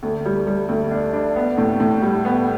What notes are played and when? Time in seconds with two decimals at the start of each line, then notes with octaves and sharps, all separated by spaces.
0.03 D2
0.25 G3
0.47 G3
0.69 D2
0.91 D4
1.13 D4
1.36 B3
1.58 A2
1.80 A2
2.02 G3
2.25 B3